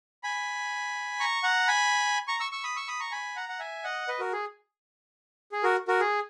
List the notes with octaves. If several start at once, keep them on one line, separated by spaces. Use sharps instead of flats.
G#5 B5
A#5 C#6
F#5 A#5
G#5 B5
A#5 C#6
C#6 E6
C#6 E6
B5 D#6
C#6 E6
B5 D#6
A#5 C#6
G#5 B5
F#5 A#5
F#5
E5 G#5
D#5 F#5
B4 D#5
F#4 A#4
G#4
G#4
F#4 A#4
F#4 A#4
G#4